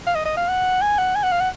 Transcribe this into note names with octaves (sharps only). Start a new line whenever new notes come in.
F5
D#5
D#5
F5
F#5
G#5
F#5
G#5
F#5
F5
F#5